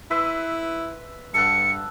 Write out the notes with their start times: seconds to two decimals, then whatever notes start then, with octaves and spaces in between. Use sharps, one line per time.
0.11 E4 B4 E5 C6
1.34 G2 A4 F#5 C#7